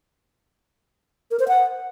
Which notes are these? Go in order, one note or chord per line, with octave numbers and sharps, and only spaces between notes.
A#4
C5
F#5